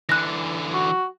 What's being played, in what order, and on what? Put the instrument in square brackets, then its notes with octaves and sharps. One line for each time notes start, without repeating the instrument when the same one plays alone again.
[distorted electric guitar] D3 E3 [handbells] F#6 A#6
[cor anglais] F#4